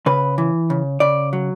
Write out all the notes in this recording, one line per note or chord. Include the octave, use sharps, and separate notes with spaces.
C#3 B4
E3
C#3
C#3 D5
F#3